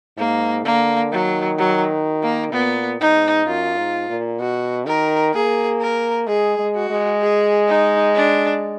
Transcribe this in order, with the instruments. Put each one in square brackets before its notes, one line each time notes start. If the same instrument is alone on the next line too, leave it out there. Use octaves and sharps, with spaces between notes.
[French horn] G#2 [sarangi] A#3
[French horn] D3 [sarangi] A#3
[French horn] D#3 [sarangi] F#3
[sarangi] F#3
A#3
[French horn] A#2 [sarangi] B3
[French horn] G#2 [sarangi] D#4
[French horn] F#2 [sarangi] F4
[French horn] G#2
A#2
[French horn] B2 [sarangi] F#4
[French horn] D#3 [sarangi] A#4
[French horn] A#3 [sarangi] G#4
[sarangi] A#4
[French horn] G#3 [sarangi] G#4
[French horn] G#3
[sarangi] F#4
[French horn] G#3
[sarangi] G#4
D#4
D4